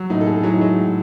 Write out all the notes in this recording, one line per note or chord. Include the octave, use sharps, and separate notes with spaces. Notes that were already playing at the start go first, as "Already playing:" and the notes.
Already playing: F#3
A2 D#4
A4
A2 G#4
A4
F#3 E4
D#4
F#3 G#3
A2